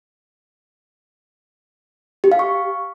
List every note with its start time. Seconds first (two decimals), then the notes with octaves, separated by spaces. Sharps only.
2.24 G4
2.32 F5
2.39 C#6